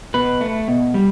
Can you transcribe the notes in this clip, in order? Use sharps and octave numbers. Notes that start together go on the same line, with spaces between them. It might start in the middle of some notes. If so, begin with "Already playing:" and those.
B2 B4
A3
B2
G3